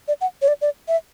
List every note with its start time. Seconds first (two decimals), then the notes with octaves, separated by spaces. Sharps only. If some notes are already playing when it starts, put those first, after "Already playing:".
0.08 D5
0.21 F#5
0.42 C#5
0.48 D5
0.61 D5
0.88 E5